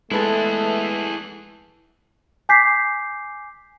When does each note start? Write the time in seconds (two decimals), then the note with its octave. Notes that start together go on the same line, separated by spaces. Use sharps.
0.11 G#3 A3 E4 G#4 A4 B4 A5
2.49 G#5 D6 G6 B6 C7